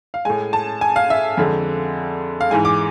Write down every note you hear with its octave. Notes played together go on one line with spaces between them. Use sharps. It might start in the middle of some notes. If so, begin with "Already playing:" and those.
F5
A2 G#3 G#5
A5
G#5
F5
E5
F2 D3 G#3
F5
G#2 E3 G#3 G#5
D6